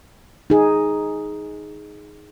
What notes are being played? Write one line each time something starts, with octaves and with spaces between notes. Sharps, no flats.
D#4 G#4